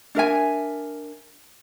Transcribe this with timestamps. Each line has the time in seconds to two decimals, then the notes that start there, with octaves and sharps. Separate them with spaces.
0.15 D4 A#4 E5 G#5